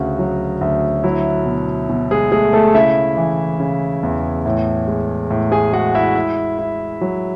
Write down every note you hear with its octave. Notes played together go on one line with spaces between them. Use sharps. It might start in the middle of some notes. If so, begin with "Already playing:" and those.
Already playing: D2 C#3 F#4
F#3
D2
F#3 E4
B2
B2
G#3 G#4
G#3 A3 G#4
A3 A4
C#3 E4 E5
E3
C#3
E2
A2
G#3
A2
G#4 G#5
G#3 F#4 F#5
E4 E5
E4
E4
F#3